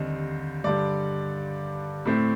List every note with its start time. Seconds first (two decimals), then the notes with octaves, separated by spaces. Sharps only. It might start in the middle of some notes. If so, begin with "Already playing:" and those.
Already playing: D#2 D3 G3 C4 D#5
0.64 G2 D3 G3 D5
2.05 A2 A3 C4